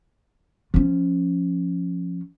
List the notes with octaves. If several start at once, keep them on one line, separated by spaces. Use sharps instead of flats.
F3 C#4